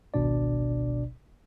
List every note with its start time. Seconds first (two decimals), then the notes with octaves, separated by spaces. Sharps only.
0.14 G#1 C#2 B2 D4 D5